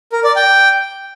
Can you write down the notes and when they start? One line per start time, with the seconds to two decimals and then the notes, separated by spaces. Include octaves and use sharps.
0.12 A#4
0.24 D5
0.36 G5